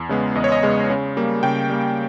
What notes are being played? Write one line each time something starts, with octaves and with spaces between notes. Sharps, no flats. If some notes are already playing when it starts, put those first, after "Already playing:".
Already playing: E2
C#3 G#3 B3
E2 D#5
C#5
D#5
C#3 G#3 B3
C#3
G3 A#3
C#3 G5
G3 A#3